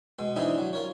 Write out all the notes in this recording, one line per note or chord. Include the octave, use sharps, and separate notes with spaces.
B2 G#3
E3 C4 D4 D#4 G#4
F#3
F4 A#4 C#5